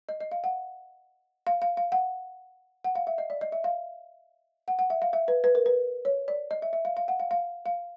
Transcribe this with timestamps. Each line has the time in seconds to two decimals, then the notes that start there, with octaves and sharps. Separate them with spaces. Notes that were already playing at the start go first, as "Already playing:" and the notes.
0.09 D#5
0.20 D#5
0.32 F5
0.44 F#5
1.47 F5
1.62 F5
1.77 F5
1.92 F#5
2.84 F#5
2.95 F5
3.07 E5
3.18 D#5
3.30 D5
3.41 D#5
3.52 E5
3.64 F5
4.68 F#5
4.79 F#5
4.90 E5
5.02 F5
5.13 E5
5.28 B4
5.44 B4
5.55 A#4
5.66 B4
6.05 C#5
6.28 D5
6.51 D#5
6.62 E5
6.73 E5
6.85 F5
6.97 F5
7.08 F#5
7.20 F5
7.31 F5
7.66 F5